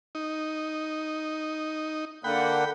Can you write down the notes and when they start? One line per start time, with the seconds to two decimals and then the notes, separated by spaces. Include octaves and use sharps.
0.15 D#4
2.24 D3 A#3 F#5 G5 B5